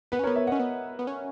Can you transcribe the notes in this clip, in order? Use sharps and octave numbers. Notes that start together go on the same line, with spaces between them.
B3 B4
C#4
B3 A#4 C#5
C#5 E5
C#4 D#5 F#5
B3
B3
C#4